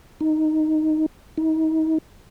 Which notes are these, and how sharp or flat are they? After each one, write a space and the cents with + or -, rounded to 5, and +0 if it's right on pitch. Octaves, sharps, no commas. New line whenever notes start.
D#4 +0
D#4 +35